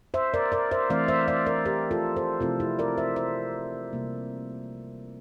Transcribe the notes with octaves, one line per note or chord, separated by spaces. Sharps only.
C5 E5
A#4 D5
A#4 D5
C5 E5
E3 A3 C4 E4 D5 F5
C5 E5
D5 F5
A#4 D5
G4 A#4
F4 A4
A4 C5
C3 F3 A3 C4 E4 F4 A4
E4 G4
A#4 D5
C5 E5
C5 E5
C3 G3 A#3